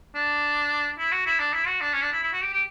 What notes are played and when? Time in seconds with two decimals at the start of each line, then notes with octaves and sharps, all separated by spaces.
0.15 D4
0.99 E4
1.12 F#4
1.26 E4
1.40 D4
1.54 E4
1.67 F#4
1.81 D4
1.93 C#4
2.02 D4
2.12 E4
2.23 E4
2.33 F#4
2.43 G4
2.53 G4